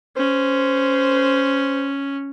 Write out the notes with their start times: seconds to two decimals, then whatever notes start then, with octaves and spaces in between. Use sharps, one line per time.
0.17 C#4 C5